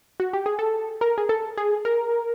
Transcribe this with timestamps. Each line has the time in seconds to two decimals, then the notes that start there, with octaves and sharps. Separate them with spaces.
0.20 F#4
0.33 G4
0.46 G#4
0.59 A4
1.01 A#4
1.18 G#4
1.29 A4
1.57 G#4
1.85 A#4